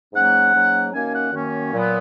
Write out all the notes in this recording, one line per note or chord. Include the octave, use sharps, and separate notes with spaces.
G#2 F#3 A#3 C#4 F#5
G#2 F#3 A#3 C#4
F#2 D#3 A#3 C#4 G#5
F#5
F#2 D#3 A#3 C#4
A#2 F#3 B3